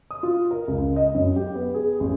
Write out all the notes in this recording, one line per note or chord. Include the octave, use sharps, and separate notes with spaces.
D#6
F4
A#4
C#2
D#5
F#2
G4
B3
G#4
A1